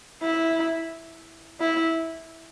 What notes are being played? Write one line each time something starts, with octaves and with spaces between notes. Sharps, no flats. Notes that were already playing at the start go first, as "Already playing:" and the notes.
E4
E4